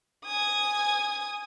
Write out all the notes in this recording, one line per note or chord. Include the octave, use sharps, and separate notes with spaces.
G#5 D#6